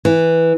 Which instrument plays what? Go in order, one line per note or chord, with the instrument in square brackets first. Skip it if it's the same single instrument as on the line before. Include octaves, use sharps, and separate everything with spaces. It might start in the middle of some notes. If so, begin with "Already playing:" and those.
[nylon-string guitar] E3